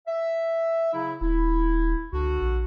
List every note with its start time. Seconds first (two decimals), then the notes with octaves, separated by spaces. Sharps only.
0.07 E5
0.93 C#3 F#3 E4
1.21 D#1 E4
2.13 C#2 D3 D4 F#4
2.42 A#1